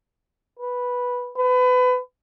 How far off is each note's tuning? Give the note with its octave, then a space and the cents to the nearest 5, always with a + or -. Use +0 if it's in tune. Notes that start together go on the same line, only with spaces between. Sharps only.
B4 -5
B4 +30